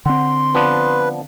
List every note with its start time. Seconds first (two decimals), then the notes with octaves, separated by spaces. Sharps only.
0.06 D3 C4 F#5 C6
0.55 F3 B3 D4 B4